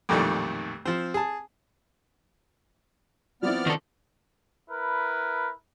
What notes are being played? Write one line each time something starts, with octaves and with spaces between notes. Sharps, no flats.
B1 F2 A#2 D#3 G3 A3
F3 C4
G#4 A5
F3 B3 C4 E4 D5 F6
D#3 A4
E4 A#4 B4